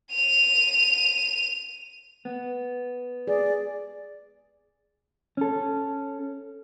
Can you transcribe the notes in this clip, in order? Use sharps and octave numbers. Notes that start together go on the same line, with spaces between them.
D#7 F7
B3
G#4 D5
C#4 A4